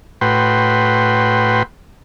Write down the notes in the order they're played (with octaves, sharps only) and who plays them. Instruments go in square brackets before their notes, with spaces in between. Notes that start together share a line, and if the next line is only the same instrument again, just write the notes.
[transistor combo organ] A2 F#4 B4 G5 C6